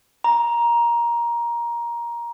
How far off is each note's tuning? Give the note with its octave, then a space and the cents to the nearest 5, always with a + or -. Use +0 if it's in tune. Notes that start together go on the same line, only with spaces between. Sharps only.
A#5 +15